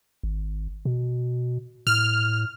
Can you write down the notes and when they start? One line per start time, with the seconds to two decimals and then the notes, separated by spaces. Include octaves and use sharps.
0.23 G#1
0.85 B2
1.87 A2 F6